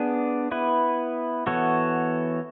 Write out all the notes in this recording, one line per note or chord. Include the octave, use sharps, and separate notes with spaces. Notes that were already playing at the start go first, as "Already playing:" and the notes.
Already playing: B3 D4 G#4
B3 E4 B4
E3 B3 F#4 A4 C#5